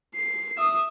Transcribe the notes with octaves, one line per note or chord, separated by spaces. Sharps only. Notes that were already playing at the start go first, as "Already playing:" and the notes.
C7
E5 D#6